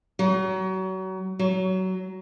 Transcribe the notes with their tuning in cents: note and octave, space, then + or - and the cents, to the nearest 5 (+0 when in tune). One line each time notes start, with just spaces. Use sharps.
F#3 +30
F#3 +20